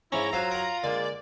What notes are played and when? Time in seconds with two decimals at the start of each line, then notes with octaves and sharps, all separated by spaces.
0.12 G#2 F3 C#4 D4 E4 A#5
0.33 F#3 F4 A4 C5 F5
0.51 A#4 F#5
0.83 D3 G#3 A#3 D5